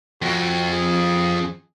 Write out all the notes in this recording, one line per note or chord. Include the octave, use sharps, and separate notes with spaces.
F2 F#4
G#4